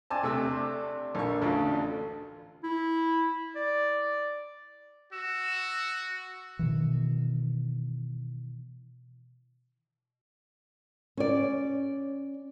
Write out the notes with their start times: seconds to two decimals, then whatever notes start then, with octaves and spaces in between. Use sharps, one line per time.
0.10 C4 D4 G#5 A5
0.23 C3 A3 E6
1.15 A#1 A4 C#6
1.42 A1 D2 F4
2.64 E4
3.56 D5
5.13 F#4 E6
6.59 B2 D#3 E3
11.17 C#4 D5